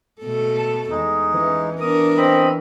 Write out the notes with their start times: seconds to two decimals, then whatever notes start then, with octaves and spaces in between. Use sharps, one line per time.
0.21 B2 A3 A4
0.58 A5
0.91 E2 G#3 D#4
1.34 E3 C#4
1.81 B3 D4 A#4 D#6
2.17 C4 D#5 B5